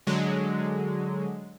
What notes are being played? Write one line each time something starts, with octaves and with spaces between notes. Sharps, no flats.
D3 F#3 G#3